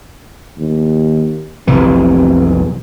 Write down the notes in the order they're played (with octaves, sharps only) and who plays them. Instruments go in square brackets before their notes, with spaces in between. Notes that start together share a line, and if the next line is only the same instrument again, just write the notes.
[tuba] D#2
[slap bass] F1 B1 E3 [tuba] C3